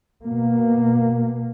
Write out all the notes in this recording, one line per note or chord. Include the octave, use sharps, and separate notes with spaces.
B2 A#3